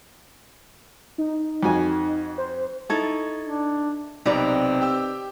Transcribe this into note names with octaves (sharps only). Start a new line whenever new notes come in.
D#4
F2 F#4 G#5
C5
D#4 E4 A4 C#6 G#6 A6
D4
B1 C3 C4 D#4 B4 D5
G4 G5 E6